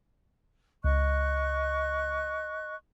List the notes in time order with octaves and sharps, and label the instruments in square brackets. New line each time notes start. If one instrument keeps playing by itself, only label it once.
[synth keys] C#2 [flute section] D#5 C#6 F#6